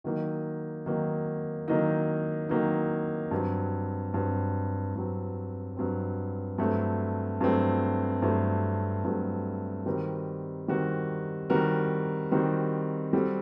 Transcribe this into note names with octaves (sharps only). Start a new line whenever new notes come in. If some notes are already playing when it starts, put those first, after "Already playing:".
D#3 F#3 A#3 D#4
D#3 F#3 A#3 D#4
D#3 F#3 A#3 D#4
D#3 F#3 A#3 D#4
G2 F#3 C4
G2 F#3 C4
G2 F#3 C4
G2 F#3 C4
G2 F#3 A3 C4
G2 F#3 A3 C4
G2 F#3 A3 C4
G2 F#3 A3 C4
D#3 G3 C4 F#4 A#4
D#3 G3 C4 F#4 A#4
D#3 G3 C4 F#4 A#4
D#3 G3 C4 F#4 A#4
G3 C4 F#4 A4